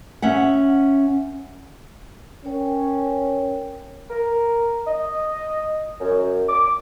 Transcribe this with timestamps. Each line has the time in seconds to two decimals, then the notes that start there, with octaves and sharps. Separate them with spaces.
0.22 C#4 E5 F#5
2.45 C#4 A#4 C#5 G5
4.10 A#4
4.87 D#5
6.01 F#2
6.49 D6